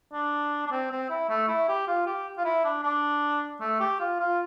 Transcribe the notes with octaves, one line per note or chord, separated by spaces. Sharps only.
D4
D4
C4
C4
E4
A3
E4
G4
F4
G4
F4
E4
D4
D4
A3
G4
F4
F4